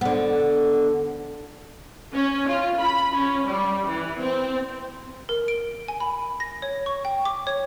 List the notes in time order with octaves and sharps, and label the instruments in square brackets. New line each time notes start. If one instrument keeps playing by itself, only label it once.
[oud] D3 B3
[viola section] C#4
F4
B5
C#4
G3
E3
C4
[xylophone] A#4
D7
G#5
B5
A#6
C#5
C#6
G5
D6
C#5